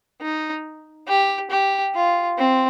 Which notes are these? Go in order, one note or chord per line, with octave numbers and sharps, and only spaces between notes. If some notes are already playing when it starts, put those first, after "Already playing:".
D#4
G4
G4
F4
C4